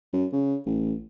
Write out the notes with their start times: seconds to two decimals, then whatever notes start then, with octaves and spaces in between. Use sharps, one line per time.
0.13 F#2
0.33 C#3
0.66 A1